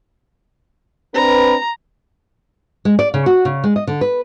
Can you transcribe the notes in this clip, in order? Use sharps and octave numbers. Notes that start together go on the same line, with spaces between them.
C4 D4 B4 A#5
G#3
D5
C#3
F#4
C#3
G#3
D#5
D3
B4